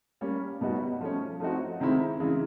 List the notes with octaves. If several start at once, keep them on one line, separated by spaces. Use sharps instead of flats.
G3 A#3 C#4
B2 G3 B3 D#4 F#4
F3 A3 C#4
F3 A3 C4 D#4 F#4
C3 D#3 G#3 C4 E4
C#3 E3 G#3